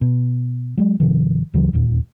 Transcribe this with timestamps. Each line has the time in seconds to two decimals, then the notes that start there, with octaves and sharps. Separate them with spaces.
0.01 B2
0.77 F#3 G#3
1.00 G1 C3 D#3 F3
1.54 D2 C#3 E3 F#3
1.73 E1 D#2 A#2